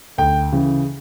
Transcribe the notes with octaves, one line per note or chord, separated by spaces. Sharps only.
D2 G5
C#3 E3